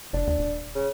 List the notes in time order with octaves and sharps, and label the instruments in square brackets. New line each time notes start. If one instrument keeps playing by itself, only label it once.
[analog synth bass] F#1 [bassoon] D4
[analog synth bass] D#2
D#1
[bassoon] C#3